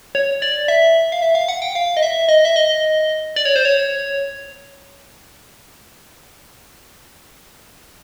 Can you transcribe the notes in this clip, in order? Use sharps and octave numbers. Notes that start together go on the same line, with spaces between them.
C#5
D5
E5
F5
E5
F5
F#5
G5
F5
D#5
E5
D#5
E5
D#5
D5
C#5
C5
C#5